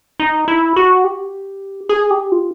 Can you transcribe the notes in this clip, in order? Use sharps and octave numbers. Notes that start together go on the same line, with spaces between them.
D#4
E4
F#4
G4
G#4
G4
F4